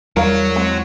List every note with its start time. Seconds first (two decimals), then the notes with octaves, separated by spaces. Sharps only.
0.17 E2 G3 F#4 A#4 C#5 F5
0.56 G#3 C4